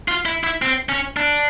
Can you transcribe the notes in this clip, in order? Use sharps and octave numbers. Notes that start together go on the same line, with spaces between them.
F4
E4
E4
C4
C#4
D4